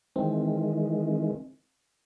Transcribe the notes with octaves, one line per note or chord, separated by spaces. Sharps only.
D#3 E3 G#3 C4